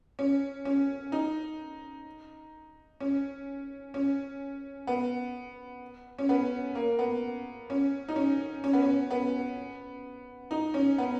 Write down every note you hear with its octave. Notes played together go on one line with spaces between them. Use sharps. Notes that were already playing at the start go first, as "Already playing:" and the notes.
C#4
C#4
D#4
C#4
C#4
B3
C#4
B3
A#3
B3
C#4
D#4
C#4
C#4
B3
C#4
B3
D#4
C#4
B3